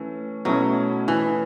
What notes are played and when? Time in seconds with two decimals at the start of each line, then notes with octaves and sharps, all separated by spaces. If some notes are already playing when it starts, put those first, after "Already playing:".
Already playing: E3 A3 C#4
0.45 B2 F#3 A3 C#4 E4
1.08 E3